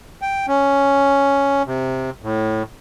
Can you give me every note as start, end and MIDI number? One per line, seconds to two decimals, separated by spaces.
0.22 0.46 79
0.48 1.63 61
1.67 2.10 48
2.22 2.63 45